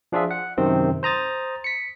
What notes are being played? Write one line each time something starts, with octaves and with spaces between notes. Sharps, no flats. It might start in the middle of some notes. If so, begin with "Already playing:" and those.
F3 D4 F4 G#4 E5
F#5
F#2 C3 D#3 C4
C5 A#5 D#6 A6
B6 C#7